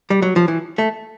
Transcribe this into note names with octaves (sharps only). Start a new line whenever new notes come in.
G3
F#3
F3
E3
A3